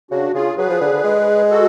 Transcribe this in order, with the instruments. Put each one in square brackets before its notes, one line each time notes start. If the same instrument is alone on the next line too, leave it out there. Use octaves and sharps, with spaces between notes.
[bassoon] C#3 [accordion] D4 F#4
[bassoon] C#3 [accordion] F4 G#4
[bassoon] F#3 [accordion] G#4 B4
[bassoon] F3
D3
D3
G#3
[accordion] F#4 A4